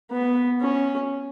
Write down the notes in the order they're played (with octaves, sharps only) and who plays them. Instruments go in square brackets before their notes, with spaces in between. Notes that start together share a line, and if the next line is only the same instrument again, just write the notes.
[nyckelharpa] B3
C#4